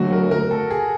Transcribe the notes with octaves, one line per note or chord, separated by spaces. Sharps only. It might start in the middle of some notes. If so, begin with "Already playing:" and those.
Already playing: D3 F#3 A3 F#4
A#4
A#4
A4
G#4